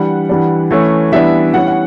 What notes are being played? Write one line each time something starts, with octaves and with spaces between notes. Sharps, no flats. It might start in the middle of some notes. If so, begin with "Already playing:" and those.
Already playing: E3 G3 D4 F#5
E3 G3 D4
E3 A3 C#4
E3 G3 B3 D4 E5
E3 G3 C#4 F#5
F#5